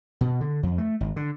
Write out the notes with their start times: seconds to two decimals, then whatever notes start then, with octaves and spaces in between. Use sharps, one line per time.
0.21 B2
0.41 D3
0.63 F2
0.78 A3
1.00 G#1
1.16 D3